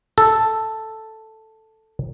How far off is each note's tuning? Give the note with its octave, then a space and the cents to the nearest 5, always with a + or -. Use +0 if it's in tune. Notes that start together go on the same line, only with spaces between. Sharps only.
A4 +0